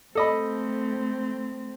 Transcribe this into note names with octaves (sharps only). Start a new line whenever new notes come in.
A3 C4 A4 D#5 B5